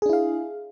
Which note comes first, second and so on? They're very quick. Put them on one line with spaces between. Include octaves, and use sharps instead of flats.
G#4 D4 E4 F5